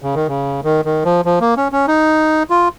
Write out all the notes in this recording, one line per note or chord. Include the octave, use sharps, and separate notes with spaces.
C#3
D#3
C#3
D#3
D#3
F3
F3
A#3
C#4
C#4
D#4
F4